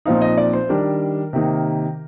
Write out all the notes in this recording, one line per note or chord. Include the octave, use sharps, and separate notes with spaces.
A#2 F3 C4 D#4 F5
D#5
D5
C5
D#3 G3 D4 A#4
C3 D#3 A#3 D#4